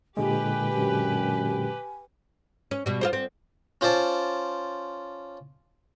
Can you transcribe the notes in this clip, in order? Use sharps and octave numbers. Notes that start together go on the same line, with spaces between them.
A#2 D3 G#3 G4 B4 G#5
F#2
C#4
B2 G3
F4 G#4 C5
C4
C#4 F4 C5 D5 A5